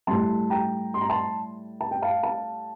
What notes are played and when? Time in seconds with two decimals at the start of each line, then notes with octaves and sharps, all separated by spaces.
0.07 A2 G3 A5 C6
0.50 G5 A#5
0.94 C6
1.01 A#5
1.09 A5 C6
1.81 A5
1.91 G5
2.02 F5 A5
2.23 F5 A5